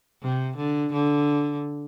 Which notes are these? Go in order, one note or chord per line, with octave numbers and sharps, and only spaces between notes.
C3
D3
D3